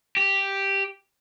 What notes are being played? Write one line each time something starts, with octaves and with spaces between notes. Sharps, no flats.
G4